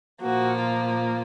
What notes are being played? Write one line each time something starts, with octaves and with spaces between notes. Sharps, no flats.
A#2 F3 A#3 F#4
F4
F4